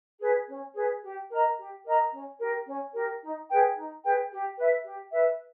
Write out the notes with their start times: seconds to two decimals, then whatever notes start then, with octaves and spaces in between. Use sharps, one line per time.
0.20 G#4 B4
0.48 C#4
0.74 G#4 B4
1.02 G4
1.30 A#4 D#5 A#5
1.57 G4
1.84 A#4 D#5 A#5
2.12 C#4
2.38 G4 A#4
2.66 C#4
2.94 G4 A#4
3.22 D#4
3.48 G#4 B4 G5
3.76 D#4
4.03 G#4 B4 G5
4.31 G4
4.58 B4 E5
4.85 G4
5.12 B4 E5